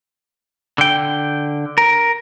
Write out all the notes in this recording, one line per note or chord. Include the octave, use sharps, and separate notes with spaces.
D3 G5
A#4